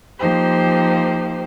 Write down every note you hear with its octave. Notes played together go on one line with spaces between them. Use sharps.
F3 A#3 D#4 G4 C5